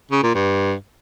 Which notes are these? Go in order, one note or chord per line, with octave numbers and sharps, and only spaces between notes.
C#3
A#2
G2